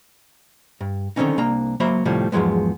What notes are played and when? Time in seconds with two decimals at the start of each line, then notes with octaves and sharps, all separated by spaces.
0.81 G2
1.16 D3 D#3 F#3 C4 C#4 D#4
1.38 C2 A#3 D4 A#5
1.80 C#2 F#3 A#3 C5 E5 B5
2.05 D#2 A2 C3 F3 G3
2.32 E2 G#2 F3 F#3 G#3 B3